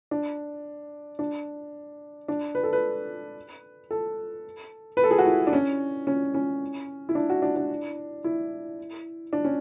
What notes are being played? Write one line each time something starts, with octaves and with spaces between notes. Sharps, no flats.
D4
D4
D4
B4
A4
B4
A4
B4
A4
G#4
F#4
E4
D4
C#4
C#4
C#4
E4
D4
F#4
D4
D4
E4
D4
C#4